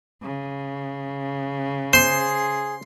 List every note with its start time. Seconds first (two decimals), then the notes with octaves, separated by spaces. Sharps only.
0.22 C#3
1.93 G#4 C5 C6